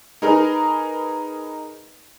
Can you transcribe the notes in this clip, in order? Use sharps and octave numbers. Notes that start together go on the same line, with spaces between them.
D#4 G#4 A#4 B4